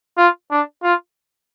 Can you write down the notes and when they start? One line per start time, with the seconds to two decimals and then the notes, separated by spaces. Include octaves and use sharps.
0.18 F4
0.51 D4
0.83 F4